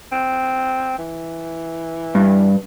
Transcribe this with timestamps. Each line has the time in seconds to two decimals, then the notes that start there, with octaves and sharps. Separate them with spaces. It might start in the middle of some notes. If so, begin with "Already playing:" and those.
0.12 C4
0.98 E3
2.15 G2